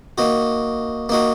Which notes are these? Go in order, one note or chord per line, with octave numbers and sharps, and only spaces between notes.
A#3 D#4 F#4
A#3 D#4 F#4